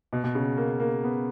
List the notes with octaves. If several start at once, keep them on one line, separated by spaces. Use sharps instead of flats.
B2
B2
C#3
A#3
A#3
B3